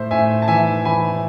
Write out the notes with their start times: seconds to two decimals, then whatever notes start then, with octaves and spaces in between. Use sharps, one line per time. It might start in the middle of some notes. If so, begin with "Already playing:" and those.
Already playing: A2 C5 E5
0.11 A2 E5 G#5
0.42 A5
0.48 E3 E5 G#5
0.85 E3 G#5 B5